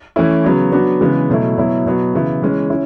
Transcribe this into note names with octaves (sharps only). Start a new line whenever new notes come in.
E3 A3 C#4 E4
C#3 F#3 B3 F#4
F#3 B3 D4 F#4
C#3 E3 G#3 B3
B2 F#3 A3 E4
B2 F#3 B3 E4
B2 F#3 B3 F#4
C#3 E3 B3 E4
E3 G#3 C#4
C#4 E4